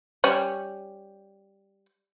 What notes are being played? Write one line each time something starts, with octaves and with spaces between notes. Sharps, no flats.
G3 C#4